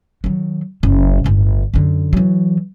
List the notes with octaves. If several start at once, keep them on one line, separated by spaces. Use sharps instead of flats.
D#3 F#3
F#1 C#3
G1 A2
F#2 D3
E3 F#3